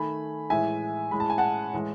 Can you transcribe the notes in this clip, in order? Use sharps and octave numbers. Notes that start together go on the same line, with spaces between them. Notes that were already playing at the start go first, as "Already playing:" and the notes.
Already playing: D#3 A3 G#5 B5
A2 E3 G#3 E5 G#5
A2 G#3 B5
A5
G#5
F#5 A5
A2 E3 G#3